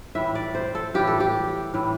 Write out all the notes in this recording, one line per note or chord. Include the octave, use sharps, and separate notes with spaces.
A2 E3 G3 E5
D5
C5
A4
A2 E3 G3 G4
A4
G4
A2 E3 G3